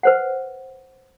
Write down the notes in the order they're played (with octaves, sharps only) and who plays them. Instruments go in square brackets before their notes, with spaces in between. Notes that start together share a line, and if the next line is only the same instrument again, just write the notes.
[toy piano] B4 C5 F#5